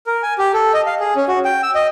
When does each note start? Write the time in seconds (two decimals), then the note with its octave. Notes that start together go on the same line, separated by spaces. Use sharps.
0.07 A#4
0.23 G#5
0.38 G4
0.54 A4
0.74 D#5
0.86 F5
1.00 G#4
1.16 C#4
1.28 F#4
1.45 G5
1.63 E6
1.75 D#5